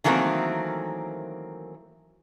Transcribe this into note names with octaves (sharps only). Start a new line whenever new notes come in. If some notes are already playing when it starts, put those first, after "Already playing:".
D#3 E3 F#3 A3 A#3 C4